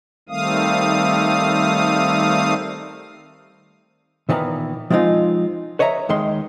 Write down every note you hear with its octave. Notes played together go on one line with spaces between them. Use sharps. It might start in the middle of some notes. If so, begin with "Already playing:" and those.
D#3 G3 A3 C4 F5 D#6
A#2 D#3 E3 B3 A#5
F3 G3 G#3 C4 D#4 F4
B4 C#5 D#5 E5 A#5
D#2 D#3 G#3 C6